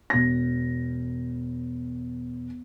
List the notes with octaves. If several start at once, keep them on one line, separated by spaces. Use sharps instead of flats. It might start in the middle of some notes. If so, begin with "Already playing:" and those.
E1 A#6